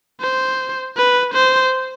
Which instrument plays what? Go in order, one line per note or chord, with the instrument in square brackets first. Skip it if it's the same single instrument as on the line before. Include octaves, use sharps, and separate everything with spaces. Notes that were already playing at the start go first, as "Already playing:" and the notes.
[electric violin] C5
B4
C5